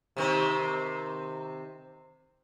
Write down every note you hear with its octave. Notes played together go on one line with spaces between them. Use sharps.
C3 D#3 C4